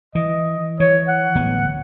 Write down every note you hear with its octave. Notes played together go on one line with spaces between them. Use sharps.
E3 D#5
E3 C#5
F#5
D1 B3